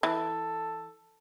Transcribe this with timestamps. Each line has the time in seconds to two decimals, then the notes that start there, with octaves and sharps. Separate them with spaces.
0.03 E3 A4